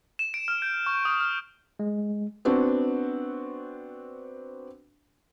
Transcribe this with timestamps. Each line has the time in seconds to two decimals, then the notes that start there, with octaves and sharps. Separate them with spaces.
0.19 E7
0.34 D7
0.48 F6
0.62 G6
0.86 C#6
1.05 D#6
1.21 F6
1.79 G#3
2.45 B3 C4 D4 F#4